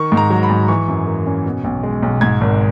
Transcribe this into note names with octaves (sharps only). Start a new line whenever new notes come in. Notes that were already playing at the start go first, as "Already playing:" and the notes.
Already playing: D#3 C#6
G#2
A#5
F#3
B5
G#2
E3 C#6
F#2
A#3
C#4
B2
B1
G#3
B1
G#2 G#6
G#1